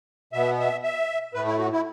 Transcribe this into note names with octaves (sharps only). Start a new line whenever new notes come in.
B2 B3 E5
E5
E5
A2 A3 B4
E4
F#4
E4